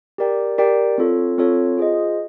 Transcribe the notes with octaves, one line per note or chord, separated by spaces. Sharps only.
G4 A#4 D5 G5
G4 A#4 D5 G5
C4 F4 A4 C#5
C4 F4 A4 C#5
F4 G#4 C5 D#5